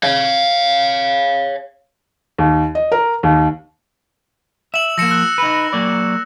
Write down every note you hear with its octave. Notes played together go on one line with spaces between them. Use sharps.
C#5 F5
D#2
D#5
A#4
D#2
E5 E6 F#7
F3 A#3 A#6 C#7 E7
E6 F#6 E7
D#4 B4
F#3 A#3 D5